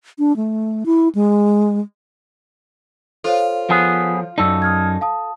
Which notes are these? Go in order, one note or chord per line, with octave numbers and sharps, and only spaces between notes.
D4
A3
E4
G#3
F4 A4 C5 C#5
F3 B3 G#4
F#2 D#4 A4 D5
D#6 F6 G#6
F5 A5 D#6